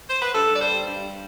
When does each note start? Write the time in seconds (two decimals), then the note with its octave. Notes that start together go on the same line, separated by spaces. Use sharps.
0.10 C5
0.22 B4
0.35 G2 A4
0.54 D5
0.60 G3 C5
0.86 G2